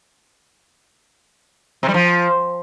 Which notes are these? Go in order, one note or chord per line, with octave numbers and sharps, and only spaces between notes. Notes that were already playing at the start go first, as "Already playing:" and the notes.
C3
G3
F3